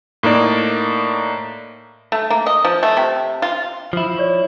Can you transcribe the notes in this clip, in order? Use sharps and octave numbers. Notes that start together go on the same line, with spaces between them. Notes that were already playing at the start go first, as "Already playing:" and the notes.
A2 A#3 D#4 D5
A3
A#3
D#5
F3
A3
C3
F4
F3 E4
C#5 D5 C#6